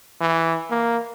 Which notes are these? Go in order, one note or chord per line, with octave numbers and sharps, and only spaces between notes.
E3
A#3